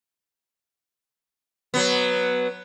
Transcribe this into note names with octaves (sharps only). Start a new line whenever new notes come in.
F#3 B3